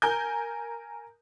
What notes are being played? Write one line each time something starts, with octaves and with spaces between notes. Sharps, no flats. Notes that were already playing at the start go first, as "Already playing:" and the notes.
A#4 G#5 G6